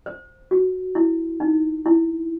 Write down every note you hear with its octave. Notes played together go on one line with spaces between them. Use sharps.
C5
F#4
E4
D#4
E4